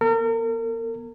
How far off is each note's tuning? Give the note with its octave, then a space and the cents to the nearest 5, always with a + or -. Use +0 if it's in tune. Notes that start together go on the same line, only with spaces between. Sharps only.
B3 -30 A#4 -40